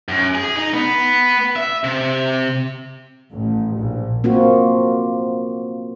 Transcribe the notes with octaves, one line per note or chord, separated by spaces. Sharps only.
F#2
G#4
D#4
B3
E5
C3
A1
A#1
A#3 C4 F4 F#4